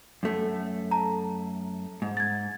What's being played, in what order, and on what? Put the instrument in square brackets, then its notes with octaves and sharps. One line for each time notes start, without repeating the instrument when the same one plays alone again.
[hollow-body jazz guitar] F#2 A3
[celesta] A5 A#5
[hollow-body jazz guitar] G#2
[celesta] G#6 A6